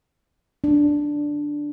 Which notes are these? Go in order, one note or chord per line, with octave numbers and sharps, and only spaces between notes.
D4